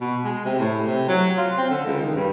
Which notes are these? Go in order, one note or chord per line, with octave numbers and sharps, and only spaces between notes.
B2
G#3
C3
A2
C3
F#3
F4
C4
D3
C#2
D#3
G2